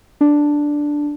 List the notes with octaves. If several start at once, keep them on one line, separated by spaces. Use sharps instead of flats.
D4